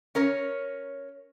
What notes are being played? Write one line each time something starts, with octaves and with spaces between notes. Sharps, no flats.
C#4 A#4 C#5